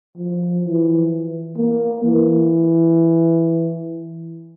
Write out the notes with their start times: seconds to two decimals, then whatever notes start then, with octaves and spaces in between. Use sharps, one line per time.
0.18 F3
0.65 E3
1.57 A#3
2.04 E3